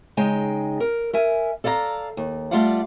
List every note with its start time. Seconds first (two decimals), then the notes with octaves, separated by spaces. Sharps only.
0.17 C#3 G#3 D#4 G5
0.80 A#4
1.13 A#4 E5 G#5
1.64 A4 D5 F5 G5 A#5
2.17 D#2
2.51 G3 A3 F4 D5 F5 F#5